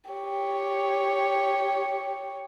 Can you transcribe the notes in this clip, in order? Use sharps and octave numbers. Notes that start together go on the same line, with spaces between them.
G4 C#5